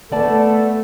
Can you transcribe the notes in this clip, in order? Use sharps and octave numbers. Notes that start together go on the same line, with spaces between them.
A3 B3 D5 A5